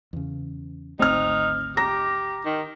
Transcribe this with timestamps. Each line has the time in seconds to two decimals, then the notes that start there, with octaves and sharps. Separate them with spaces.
0.13 E2 C#3
0.99 G#1 D2 A3 C4 D#4 F6
1.77 G4 A#5 A#6
2.45 D#3